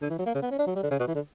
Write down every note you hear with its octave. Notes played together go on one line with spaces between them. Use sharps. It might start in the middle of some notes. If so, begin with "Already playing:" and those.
D3
E3
F#3
A#3
C#3
B3
C#4
D4
F#3
G3
D3
C#3
B2
E3
D3